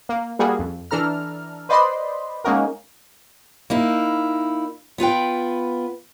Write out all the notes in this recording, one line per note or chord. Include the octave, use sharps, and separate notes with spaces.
A#3
G3 A#3 F#4 G#4
F2
E3 D4 A4 A#5 F6
B4 C5 D5 D#5 B5 C6
G#3 A#3 C#4 D#4 F#4 A#4
A#3 D#4 E4
B3 F4 B4 G5